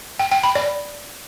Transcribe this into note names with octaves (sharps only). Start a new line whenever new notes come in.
G5
G5
B5
D5